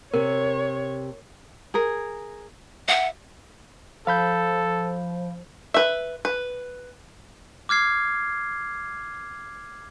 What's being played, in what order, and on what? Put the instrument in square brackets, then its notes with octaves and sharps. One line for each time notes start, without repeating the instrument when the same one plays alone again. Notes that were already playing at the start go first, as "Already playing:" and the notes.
[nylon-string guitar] C3 [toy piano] A#4 [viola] C#5
[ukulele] G#4 A#4
[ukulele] E5 [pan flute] F#5
[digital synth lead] F3 [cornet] A4 [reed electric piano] F5 B5 G6
[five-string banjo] B4 E5
B4
[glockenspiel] D6 F6 G#6 C7